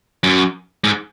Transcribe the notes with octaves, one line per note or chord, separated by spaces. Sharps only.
F#2
G#2